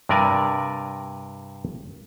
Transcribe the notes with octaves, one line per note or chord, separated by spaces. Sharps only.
G2 C3 A#4 D5 G#5